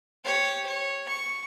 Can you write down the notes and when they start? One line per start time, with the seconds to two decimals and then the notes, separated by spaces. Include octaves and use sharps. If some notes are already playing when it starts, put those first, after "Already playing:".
0.25 G4 C#5
0.67 C#5
1.09 C#6